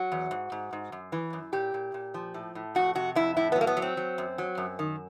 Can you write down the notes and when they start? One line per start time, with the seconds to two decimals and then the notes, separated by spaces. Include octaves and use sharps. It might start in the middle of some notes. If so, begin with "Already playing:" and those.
Already playing: F#3 F#4
0.12 E2
0.31 G#2
0.52 G#2
0.73 G#2
0.92 F#2
1.12 E3
1.33 F#2
1.53 A#2 G4
1.74 A#2
1.94 A#2
2.14 F3
2.34 A2
2.55 A2
2.75 F2 F#4
2.95 C3 F#4
3.15 F2 E4
3.37 A2 E4
3.52 B3
3.56 F#3
3.61 A#3
3.67 B3
3.77 F#3
3.82 C4
3.97 F#3
4.18 F#2
4.38 F#3
4.57 F#2
4.79 D#3